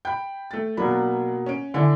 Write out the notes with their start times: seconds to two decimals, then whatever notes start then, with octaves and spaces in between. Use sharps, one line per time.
0.05 G5 B5 G6
0.51 A3 A6
0.77 B2 F#3 A#3 D4 B5
1.46 C#4 D7
1.74 D3 E4 G#5